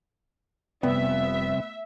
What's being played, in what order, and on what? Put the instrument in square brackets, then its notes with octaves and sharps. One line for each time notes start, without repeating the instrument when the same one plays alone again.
[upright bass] F1 [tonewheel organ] C3 G3 C4 [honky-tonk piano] B3 [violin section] E5